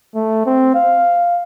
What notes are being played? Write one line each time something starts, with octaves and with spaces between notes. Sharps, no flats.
A3
C4
F5